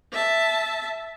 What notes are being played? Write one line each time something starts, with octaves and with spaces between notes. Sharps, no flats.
E5 A5